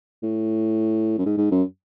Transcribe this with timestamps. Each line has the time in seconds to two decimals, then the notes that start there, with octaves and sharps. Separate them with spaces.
0.23 A2
1.18 F#2
1.26 G#2
1.37 G#2
1.51 F#2